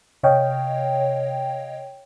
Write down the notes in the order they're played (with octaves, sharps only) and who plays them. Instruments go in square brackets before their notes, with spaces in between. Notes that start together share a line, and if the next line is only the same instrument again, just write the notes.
[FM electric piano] C3 C#5 D#5 F5 G5